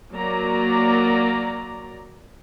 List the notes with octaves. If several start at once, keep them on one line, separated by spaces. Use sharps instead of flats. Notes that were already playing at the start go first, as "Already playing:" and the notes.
F#3 A#3 D5 A#5